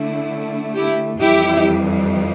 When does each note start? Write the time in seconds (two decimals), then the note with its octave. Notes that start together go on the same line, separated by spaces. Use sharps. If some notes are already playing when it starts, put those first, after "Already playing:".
Already playing: D3 A3 E4
0.74 E4 G4
1.19 F2 E3 G3 E4 G4